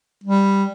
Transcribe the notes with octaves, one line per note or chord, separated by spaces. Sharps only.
G3